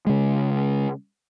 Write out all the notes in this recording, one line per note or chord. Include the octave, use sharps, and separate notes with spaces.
C#3 G#3